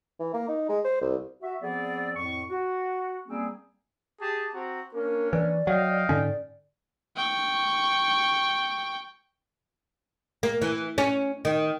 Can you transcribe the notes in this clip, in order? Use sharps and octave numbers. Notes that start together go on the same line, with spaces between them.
E3
A#3
D#4
G#3
C5
C2
F#4 E5
F3 B3 C4 G#4 D5
F2 A2 C#6
F#4
G3 A#3 C4 C#4 G#4
G4 G#4 A5
C4 F#4 A#5
A#3 C#4 D4 A#4
E3 D5
F#3 D#5 F5 G5
G#2 D3 C#4 D5
G5 C#6
A#3
E3
C#4
D#3